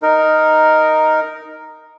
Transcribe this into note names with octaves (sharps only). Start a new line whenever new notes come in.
D#4 A#4